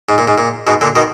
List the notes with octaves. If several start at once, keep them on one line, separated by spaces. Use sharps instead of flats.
G#2
A#2
G#2
A#2
G#2 B2
A#2 D3
B2 D#3